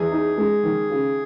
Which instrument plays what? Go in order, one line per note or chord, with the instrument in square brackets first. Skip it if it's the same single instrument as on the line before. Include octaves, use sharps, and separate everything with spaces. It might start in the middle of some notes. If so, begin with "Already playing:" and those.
Already playing: [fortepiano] E2 [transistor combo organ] G#4
[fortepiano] D#4
G#3
D#3
C#3